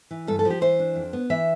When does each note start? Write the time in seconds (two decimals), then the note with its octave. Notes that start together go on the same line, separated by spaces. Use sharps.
0.11 E3
0.27 G2 A4
0.39 A4
0.45 F3
0.50 G4
0.61 E3 C5
0.79 D4
0.96 F2
1.13 B3
1.30 E3 E5